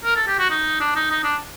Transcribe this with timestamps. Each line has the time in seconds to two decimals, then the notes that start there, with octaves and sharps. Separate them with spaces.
0.05 A#4
0.16 A4
0.28 G4
0.39 F#4
0.50 D#4
0.80 D4
0.95 D#4
1.11 D#4
1.24 D4